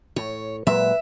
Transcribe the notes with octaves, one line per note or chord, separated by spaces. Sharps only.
A2 C#5
A#2 F#3 G#3 B4 E5